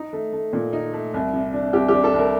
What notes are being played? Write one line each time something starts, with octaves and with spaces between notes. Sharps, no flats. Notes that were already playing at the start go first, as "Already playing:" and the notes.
Already playing: D#4
A3
A3
A#2
D#4
A3
C2
C3
D4
C2 G4
D4 G4
A4
C2 A#4